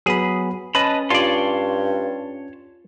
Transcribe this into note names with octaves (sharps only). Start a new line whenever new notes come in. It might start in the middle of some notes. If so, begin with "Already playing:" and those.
F#3 B3 G#4 B5
C#4 B4 D#5 A5 B5
G2 F4 C#5 D5 A5 C6